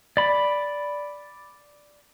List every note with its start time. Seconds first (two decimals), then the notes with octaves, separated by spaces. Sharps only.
0.17 D5 B5